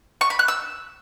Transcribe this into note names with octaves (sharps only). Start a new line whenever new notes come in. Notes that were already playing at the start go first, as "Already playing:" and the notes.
C#6
B5
F#6
E6